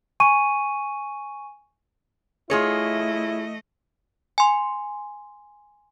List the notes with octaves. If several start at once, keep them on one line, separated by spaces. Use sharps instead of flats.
G#5 C#6 D#7
A3 E4 F4 G#4 C#5 D#5
G#5 C6